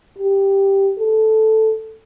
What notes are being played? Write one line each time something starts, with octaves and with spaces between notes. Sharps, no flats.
G4
A4